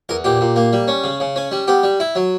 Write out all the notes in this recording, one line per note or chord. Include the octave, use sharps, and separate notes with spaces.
E2 A#4
A#2 G4
A#2
A#3
G3
C#4
C#3
C#3
C#4
G3
B3 G4
G3
E4
F#3